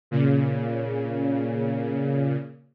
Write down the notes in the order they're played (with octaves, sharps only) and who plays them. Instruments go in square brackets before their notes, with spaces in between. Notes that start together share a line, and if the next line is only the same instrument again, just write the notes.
[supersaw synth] A#2 C#3